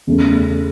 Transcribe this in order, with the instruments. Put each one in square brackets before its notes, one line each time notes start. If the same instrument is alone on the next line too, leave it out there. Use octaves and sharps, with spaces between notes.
[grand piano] E2 C#3 A3